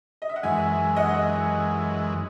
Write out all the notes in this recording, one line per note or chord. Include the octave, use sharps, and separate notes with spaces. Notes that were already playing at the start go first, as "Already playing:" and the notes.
D#5
E5
F#5
F#2 E3 G#3 E5 G#5
D#5 F#5